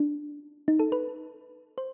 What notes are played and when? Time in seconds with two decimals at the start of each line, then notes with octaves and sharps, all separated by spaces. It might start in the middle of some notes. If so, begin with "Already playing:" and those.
Already playing: D4
0.68 D#4
0.79 A4
0.92 B4
1.78 C5